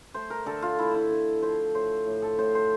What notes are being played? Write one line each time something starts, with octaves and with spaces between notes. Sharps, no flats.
A3 C5
A#4
D3 A4
F4
A3 E4
E4
D3
F3 C5
A2 C5
A2
A4
A2 C5
C5